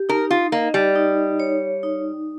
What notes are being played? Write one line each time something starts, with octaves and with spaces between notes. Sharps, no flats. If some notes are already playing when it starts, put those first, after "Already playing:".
Already playing: G4
D#4 A#4
F4
A#3 D#5
G3
D#4
C#5
D#4